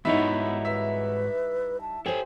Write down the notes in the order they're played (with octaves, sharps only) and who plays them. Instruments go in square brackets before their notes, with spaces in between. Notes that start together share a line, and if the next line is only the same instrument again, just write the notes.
[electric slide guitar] G#2 F#4 C#5 [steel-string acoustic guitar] G3 D#4 E4 [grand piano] B3 E5
[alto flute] B4 [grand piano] E5
[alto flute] A5
[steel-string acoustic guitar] G4 C5 [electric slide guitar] A4 G#5 [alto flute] C#5